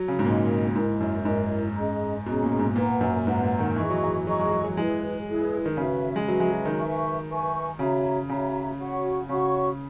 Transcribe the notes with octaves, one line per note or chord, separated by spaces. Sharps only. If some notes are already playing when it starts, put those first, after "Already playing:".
Already playing: F#3
C#3
G#2
A#2 D#4 A#4 D#5
A#2
G#2 E4 A#4 D#5
F#2
G#2 E4 A#4 D#5
C#4 G#4 D#5 A#5
B2 C#4 G#4 D#5 A#5
A#2
G#2
A#2 B4 F#5 A#5
F#2
G#2 B4 F#5 A#5
A#2
D#3
E3 G#4 D#5 A#5 C#6
F#3
E3
F#3 G#4 D#5 A#5 C#6
G#3
F#3
F#3
G#3 E4 G#4 B4
E4 G#4 B4
D#3
C#3 F#4 B4 E5
G#3
F#3 F#4 B4 E5
G#3
F#3
D#3
B4 E5 G#5 C#6
B4 E5 G#5 C#6
C#3 F#4 C#5 E5 A#5
C#3 F#4 C#5 E5 A#5
F#4 C#5 F#5 C#6
C#3 F#4 C#5 F#5 C#6